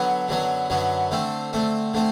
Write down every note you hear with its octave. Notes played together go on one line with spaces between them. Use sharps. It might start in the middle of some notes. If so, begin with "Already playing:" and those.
Already playing: D3 F#3 B3
F#2 D3 F#3 B3
F#2 D3 F#3 B3
D3 A3 C4
D3 A3 C4
D3 A3 C4